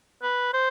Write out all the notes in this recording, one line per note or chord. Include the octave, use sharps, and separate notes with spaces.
B4
C5